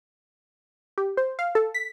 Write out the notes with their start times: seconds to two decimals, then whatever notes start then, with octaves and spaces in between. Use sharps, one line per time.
0.98 G4
1.17 C5
1.39 F5
1.55 A4
1.74 B6